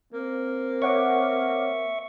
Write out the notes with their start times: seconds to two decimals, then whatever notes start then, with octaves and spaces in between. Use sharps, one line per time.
0.13 A#3 C4
0.82 C#5 E5 F#5 C#6 D6